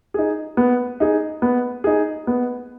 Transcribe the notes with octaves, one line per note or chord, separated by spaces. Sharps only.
D#4 G#4
B3
D#4 G#4
B3
D#4 G#4
B3